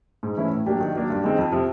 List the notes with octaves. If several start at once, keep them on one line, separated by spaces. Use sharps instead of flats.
G#2
E3 A3 C#4 E4
A2
F#3 A#3 D4 G4
D#3
F#3 A#3 D4
G2
D#3 G#3 C4 D#4
F2
C3 F3